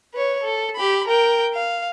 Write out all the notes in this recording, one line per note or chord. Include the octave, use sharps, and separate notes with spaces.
B4 C#5
A4
G4 B5
A#4 G5
F5